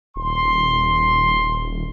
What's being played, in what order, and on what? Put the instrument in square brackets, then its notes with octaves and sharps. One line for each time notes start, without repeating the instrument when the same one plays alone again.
[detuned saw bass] D#1 [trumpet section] C6